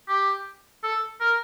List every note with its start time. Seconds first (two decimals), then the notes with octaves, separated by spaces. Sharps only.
0.08 G4
0.84 A4
1.21 A#4